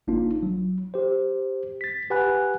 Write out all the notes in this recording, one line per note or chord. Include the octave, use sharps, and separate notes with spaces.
G1 A#3 D4 D#4 F4
F#3
G4 C5
A6 B6
G4 B4 F#5 G#5 B5 F#6